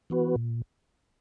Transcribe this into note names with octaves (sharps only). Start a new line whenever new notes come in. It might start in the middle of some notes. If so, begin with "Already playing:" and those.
E3 B3 F#4 B4
A#2